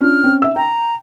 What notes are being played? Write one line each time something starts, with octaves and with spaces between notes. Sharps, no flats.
C#4 D4 F4 F6
C4 C#4
E5 E6
G5 A#5